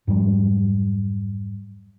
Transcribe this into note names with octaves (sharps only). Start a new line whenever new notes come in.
F2 G#2 F#3 G3